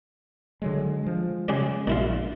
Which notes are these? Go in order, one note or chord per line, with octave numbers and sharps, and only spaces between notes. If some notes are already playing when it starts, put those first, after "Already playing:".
D3 F#3 G#3
F3 G#3
C#3 G#3 G#4 D5
A#1 A#2 E4 F4